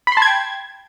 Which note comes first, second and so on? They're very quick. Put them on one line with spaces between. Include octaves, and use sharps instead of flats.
B5 C6 A5 G#6 G5